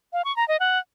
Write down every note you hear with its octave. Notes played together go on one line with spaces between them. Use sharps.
F5
C#6
A#5
D#5
F#5